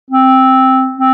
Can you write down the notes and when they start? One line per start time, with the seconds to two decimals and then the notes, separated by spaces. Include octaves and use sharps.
0.10 C4
0.97 C4